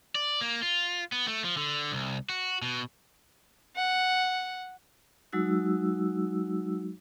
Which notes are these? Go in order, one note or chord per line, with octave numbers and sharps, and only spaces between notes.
D5
A#3
F4
B3
A3
F3
D3
C2
F#4
B2
F#5
F#3 G#3 D#4 F#4 E6